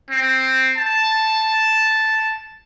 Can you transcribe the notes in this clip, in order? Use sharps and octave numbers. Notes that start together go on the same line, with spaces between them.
C4
A5